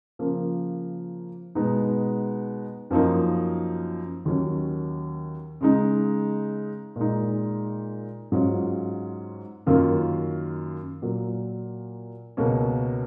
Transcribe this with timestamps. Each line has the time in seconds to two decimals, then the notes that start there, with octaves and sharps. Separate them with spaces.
0.19 C#3 F3 A#3
1.55 B2 G#3 B3 D#4
2.91 F#2 F3 A#3 D#4
4.25 D#2 D#3 F#3 C#4
5.61 C#3 G#3 D#4
6.96 A#2 G#3 D#4
8.32 G#2 F#3 C#4 F4
9.67 F#2 D#3 A#3 F4
11.02 A#2 F#3 A#3
12.37 C#2 B2 A#3 C#4